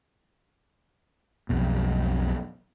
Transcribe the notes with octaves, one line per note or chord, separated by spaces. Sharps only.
B1 F2 B2